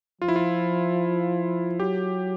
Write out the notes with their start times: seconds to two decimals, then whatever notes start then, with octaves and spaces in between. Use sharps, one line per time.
0.21 F3 F4
0.28 E4
0.36 F4
1.79 F#3 G4